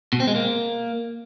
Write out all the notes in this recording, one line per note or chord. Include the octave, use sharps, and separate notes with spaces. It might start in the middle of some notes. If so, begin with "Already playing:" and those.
B2
C4
G#3
A#3